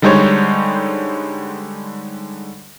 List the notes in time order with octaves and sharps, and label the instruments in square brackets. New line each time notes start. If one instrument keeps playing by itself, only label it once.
[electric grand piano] D3 G3 G#3 D#4 C5 C#5